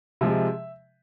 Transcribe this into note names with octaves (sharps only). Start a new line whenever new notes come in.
C3 F3 G#3 E5